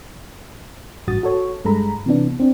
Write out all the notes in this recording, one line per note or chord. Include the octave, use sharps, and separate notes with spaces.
A1 G2 F#4 D#6 A6
F#4 A4 C#5
G2 G#3 A4 A#5 B5
C3 E3 B3 D4
C4 D4